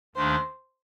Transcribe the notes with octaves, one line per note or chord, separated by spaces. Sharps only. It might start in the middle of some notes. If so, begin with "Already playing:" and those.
D#2 D#3 A3 D4 C5